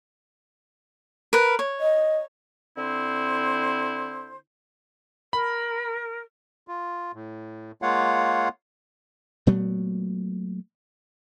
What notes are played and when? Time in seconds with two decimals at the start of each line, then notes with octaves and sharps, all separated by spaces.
1.33 A#4 B4
1.59 C#5
1.80 D#5
2.77 D3 C4 E4 C5
5.33 A#4 B5
6.68 F4
7.14 A2
7.82 G#3 A#3 F4 C#5 F5 F#5
9.47 A#2 F#3 A3 B3